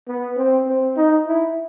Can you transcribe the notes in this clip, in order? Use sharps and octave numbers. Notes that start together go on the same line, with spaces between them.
B3
C4
C4
D#4
E4